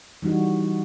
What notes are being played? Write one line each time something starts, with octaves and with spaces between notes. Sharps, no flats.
E3 G3 D#4 F#4